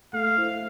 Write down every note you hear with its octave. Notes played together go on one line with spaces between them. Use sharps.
A3 F5
E4 A4 C5